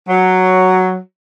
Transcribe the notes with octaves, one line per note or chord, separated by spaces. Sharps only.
F#3